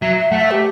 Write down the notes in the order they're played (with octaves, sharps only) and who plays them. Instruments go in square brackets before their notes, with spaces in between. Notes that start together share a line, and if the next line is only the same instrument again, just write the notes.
[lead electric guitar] F#3 [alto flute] E5
[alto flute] E5
[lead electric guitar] A3 [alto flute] F#5
[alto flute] E5
G4